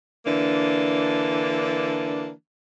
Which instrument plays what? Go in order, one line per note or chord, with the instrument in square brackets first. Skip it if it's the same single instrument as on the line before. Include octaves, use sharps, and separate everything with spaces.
[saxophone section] D3 E3 A#3 D4